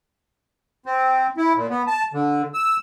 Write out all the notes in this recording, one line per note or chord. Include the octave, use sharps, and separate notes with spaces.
C4
E4
A#2
B3
A5
D3
E6